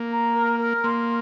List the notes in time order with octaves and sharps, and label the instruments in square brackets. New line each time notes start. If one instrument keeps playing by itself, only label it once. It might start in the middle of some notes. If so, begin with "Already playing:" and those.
Already playing: [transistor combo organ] A#3
[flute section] A#5
A#4
A#4
[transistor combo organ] A#3 [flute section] C6